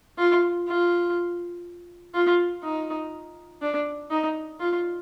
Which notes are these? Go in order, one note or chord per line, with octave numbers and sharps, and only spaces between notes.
F4
F4
F4
D#4
D4
D#4
F4